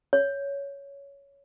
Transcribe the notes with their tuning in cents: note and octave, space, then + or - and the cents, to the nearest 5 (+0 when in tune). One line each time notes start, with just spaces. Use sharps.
C#5 +10